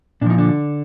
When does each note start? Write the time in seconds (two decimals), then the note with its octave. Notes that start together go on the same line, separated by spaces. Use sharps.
0.21 A#2 D4
0.26 F3 D#4
0.38 D3 D4